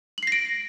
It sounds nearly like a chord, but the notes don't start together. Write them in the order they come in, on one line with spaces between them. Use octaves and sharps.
F#7 C7 A#6 D7